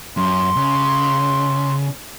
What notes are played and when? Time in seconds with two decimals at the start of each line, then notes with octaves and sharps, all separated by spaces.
0.17 F#2 C6
0.56 C#3